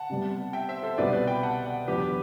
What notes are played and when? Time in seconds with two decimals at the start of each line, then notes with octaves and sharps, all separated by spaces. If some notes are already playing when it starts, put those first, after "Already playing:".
Already playing: F#5 A5
0.10 C3 G3 B3
0.53 E5 G5
0.69 C5 E5
0.83 A4 C5
0.98 C2 B2 G3 B4 D5
1.13 B4 D5
1.28 G5 B5
1.43 F#5 A5
1.65 D5 F#5
1.88 E2 D3 F#3 B3 F#4 G4 B4